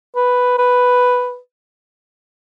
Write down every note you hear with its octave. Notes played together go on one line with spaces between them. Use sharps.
B4
B4